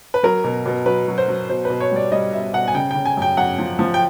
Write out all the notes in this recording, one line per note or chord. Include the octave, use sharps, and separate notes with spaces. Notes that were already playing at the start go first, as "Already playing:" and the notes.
B4
F#3 A#4
B2
B2
F#3 B4
F#3
C5
F#3
B2 C5
B2 B4
C#5
G3 D5
G3 D#5
B2 E5
B2 F#5
G#5
C#3 G5
C#3 G5
G#5
F#2 G5
F#2 F#5
F3
F3
G5